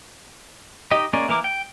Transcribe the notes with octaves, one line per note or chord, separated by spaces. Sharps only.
D#4 G4 D#5
G#3 A#3 C#4 D5
E3 A#3 A#4 D6
G5